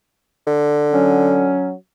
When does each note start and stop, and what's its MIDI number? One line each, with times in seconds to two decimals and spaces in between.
0.47 1.57 50
0.91 1.71 54
0.91 1.71 61